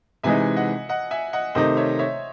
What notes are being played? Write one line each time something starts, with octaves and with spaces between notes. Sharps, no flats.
C3 E3 G#3 D#4 E5 G#5
D#5 F#5
D#5 F#5
E5 G#5
D#5 F#5
C3 D#3 A3 D#4 C5 D#5
C#5 E5
C#5 E5